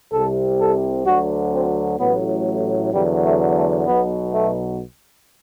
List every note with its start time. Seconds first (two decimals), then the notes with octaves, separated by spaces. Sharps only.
0.13 C2 C3 G3 A4
0.59 A4
1.06 D2 D3 F#3 F#4
1.53 C4
2.00 A1 A2 F#3 B3
2.93 E2 D3 F#3 G3
3.25 A3
3.55 A3
3.87 B1 B2 F#3 B3
4.34 A3